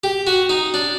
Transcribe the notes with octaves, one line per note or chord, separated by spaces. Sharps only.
G4
F#4
D#4
D4